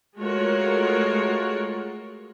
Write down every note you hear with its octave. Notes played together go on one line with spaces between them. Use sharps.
G#3 A3 F4 F#4 A#4 C#5